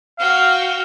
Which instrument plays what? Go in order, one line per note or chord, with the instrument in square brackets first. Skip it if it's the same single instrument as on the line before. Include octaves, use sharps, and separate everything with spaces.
[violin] F#4 G5 [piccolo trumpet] F5